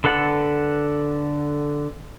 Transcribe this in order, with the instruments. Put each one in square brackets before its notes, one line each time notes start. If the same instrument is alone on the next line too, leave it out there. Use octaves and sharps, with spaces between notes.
[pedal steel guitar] D3 A4 B4 F#5